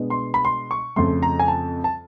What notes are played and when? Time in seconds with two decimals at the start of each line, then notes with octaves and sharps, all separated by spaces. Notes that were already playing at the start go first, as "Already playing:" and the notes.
Already playing: B2 G#3 B3 D4
0.10 C6
0.34 B5
0.45 C6
0.71 C#6
0.96 F2 C#3 F3 A3 C6
1.23 A#5
1.39 G#5
1.48 A5
1.84 A5